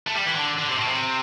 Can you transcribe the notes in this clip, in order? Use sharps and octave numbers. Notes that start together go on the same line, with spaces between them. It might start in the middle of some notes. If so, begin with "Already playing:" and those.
A3
G3
E3
D3
D3
C3
A2
C3